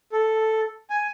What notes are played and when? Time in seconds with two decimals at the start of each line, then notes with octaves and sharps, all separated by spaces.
0.12 A4
0.90 G#5